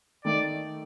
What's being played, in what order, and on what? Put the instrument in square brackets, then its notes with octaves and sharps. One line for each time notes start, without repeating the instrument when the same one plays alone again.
[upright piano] D#3 A3 D#4 [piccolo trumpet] D5